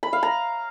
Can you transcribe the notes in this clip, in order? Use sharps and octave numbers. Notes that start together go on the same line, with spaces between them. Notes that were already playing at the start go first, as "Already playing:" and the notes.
B5
F5
A#5